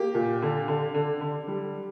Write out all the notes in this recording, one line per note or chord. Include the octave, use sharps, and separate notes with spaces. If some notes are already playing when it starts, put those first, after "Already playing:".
Already playing: A#3 G4
A#2
D3
D3
D3
D3
G3